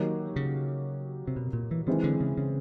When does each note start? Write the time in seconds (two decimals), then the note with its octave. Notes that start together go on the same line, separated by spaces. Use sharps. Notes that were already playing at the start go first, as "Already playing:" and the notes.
Already playing: D#3 F#3 A#3 D#4 G4
0.36 C#3
1.28 C3
1.36 B2
1.53 A#2
1.71 E3
1.87 D#3 E3 G#3 C4
2.04 D3
2.21 C#3
2.37 C#3